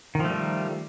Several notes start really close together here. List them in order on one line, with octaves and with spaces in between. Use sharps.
D#3 F3 A3 G3